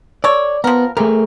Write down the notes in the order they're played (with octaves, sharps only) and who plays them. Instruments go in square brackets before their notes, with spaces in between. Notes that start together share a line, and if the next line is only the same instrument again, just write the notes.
[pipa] A4 C#5 [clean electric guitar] D5
[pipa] F3 A#4 [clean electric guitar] B3
[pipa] C3 [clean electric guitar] A3 G#4 A#4